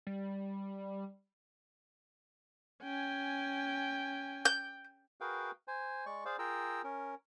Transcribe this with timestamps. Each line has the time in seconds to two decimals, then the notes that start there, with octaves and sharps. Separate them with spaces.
0.07 G3
2.83 C#4 G5 G#5
4.45 G6
5.21 F#4 G#4 A#4 B4 F5 G5
5.68 C5 G#5
6.06 G#3 D5 C#6
6.25 G#4 C5 D5 F5
6.39 F4 G#4 A#4 G5 A#5 E6
6.84 C#4 A#4